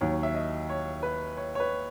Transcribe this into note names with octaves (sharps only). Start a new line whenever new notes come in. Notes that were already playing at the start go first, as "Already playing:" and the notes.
D#2 D#3 F#3 C#5
E5
D#5
C#5
B4
C#5
C#5
B4